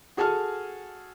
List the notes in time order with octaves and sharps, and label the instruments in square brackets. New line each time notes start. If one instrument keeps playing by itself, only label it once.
[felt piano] F#4 G#4 A4 G#5 A5 F6